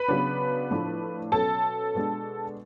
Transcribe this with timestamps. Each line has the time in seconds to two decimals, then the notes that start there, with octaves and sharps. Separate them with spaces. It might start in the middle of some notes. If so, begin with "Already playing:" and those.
Already playing: B4 B5
0.08 C#3 F#3 B3 D4
0.71 A2 F3 A3 D4
1.32 B2 F#3 C#4 A4 A5
1.95 B2 G#3 D4